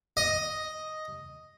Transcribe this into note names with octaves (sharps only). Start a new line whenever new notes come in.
D#5